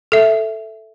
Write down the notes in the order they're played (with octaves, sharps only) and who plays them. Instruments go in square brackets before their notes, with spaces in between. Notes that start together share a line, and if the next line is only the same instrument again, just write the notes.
[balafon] A4 E5